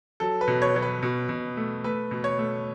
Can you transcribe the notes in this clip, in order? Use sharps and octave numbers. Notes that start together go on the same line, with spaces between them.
F#3 A4
B4
B2
C#5
F#3 C#5
B4
B2
B2
A3
A3 B4
B2
C#5
A3